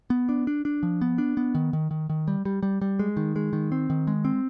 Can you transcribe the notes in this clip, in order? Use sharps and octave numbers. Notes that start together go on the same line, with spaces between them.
B3
D4
D4
D4
F3
B3
D4
B3
D#3
D#3
D#3
D#3
G3
G3
G3
G3
G#3
D#3
G#3
D#3
C4
D#3
G#3
C4